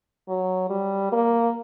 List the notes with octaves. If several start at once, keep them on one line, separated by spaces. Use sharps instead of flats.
F#3
G3
A#3